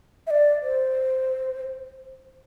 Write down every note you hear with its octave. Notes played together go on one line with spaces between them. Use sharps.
E5
D5
C5